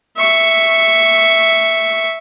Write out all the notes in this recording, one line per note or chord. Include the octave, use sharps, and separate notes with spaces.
E5 C#6